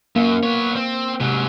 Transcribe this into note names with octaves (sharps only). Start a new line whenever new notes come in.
F#2 A#3
B3 C#5
C4
G#2 C3 F#3